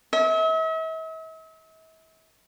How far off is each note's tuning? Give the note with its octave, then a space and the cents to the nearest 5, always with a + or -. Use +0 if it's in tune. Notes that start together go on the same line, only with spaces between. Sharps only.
E5 -45